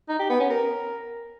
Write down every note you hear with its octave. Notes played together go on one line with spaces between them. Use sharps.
D#4
G4
B3
C#4
A#4